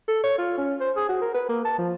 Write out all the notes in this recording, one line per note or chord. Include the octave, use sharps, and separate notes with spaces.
A4
C#5
F4
C#4
C5
G#4
F#4
A#4
B4
A#3
A5
F3